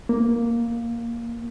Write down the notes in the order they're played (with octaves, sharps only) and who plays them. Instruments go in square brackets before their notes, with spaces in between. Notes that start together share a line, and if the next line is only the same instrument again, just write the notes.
[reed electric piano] A#3